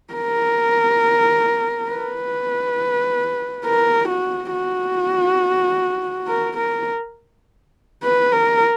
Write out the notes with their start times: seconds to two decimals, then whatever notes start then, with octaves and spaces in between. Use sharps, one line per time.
0.13 A#4
1.90 B4
3.65 A#4
4.09 F#4
4.52 F#4
6.28 A#4
6.57 A#4
8.03 B4
8.32 A#4